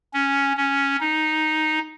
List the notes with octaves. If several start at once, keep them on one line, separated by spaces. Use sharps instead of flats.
C#4
C#4
D#4